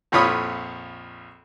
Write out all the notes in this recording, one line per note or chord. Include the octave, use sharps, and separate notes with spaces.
A#1 F2 F4 C#5 B5 D#6